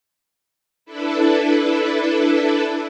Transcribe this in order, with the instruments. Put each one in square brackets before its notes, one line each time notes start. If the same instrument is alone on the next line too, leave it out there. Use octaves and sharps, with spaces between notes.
[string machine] D4 E4 A4 B4